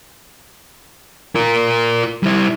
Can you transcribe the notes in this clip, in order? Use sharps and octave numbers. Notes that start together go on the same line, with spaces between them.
F4 A#4
G3 E4